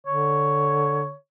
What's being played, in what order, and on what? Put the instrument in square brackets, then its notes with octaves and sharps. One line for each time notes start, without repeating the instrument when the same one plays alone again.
[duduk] D3 [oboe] C#5